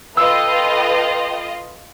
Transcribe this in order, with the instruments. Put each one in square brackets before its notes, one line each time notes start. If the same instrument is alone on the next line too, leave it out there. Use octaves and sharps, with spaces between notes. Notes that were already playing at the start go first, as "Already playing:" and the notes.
[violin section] F4 D#5 [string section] A4 B4 G5 [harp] E6